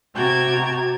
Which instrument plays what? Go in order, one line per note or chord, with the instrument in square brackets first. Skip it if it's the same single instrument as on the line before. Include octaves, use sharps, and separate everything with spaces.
[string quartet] C3 F#4 G5 A5 A#5 G#6